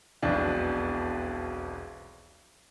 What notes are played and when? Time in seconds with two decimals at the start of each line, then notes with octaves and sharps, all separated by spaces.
0.22 E1 B1 F2 E3 D4